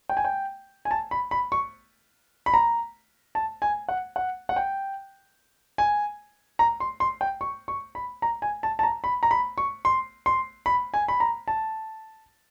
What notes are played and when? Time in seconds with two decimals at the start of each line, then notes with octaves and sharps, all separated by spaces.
0.09 G5
0.17 G#5
0.25 G5
0.85 G#5
0.91 A5
1.11 B5
1.31 B5
1.52 C#6
2.46 B5
2.54 A#5
3.35 A5
3.62 G#5
3.89 F#5
4.16 F#5
4.49 F#5
4.56 G5
5.78 G#5
6.59 A#5
6.80 C6
7.00 C6
7.21 G5
7.41 C#6
7.68 C#6
7.95 B5
8.22 A#5
8.42 G#5
8.63 A5
8.79 A5
8.83 A#5
9.04 B5
9.23 A#5
9.31 B5
9.58 C#6
9.85 C6
10.26 C6
10.66 B5
10.94 G#5
11.08 B5
11.20 A#5
11.48 A5